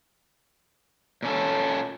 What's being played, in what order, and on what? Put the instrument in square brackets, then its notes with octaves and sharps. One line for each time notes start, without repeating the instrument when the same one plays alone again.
[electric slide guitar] A#2 C#4 A4